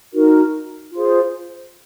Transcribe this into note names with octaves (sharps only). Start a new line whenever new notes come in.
D#4 F#4 A#4
F4 G#4 C5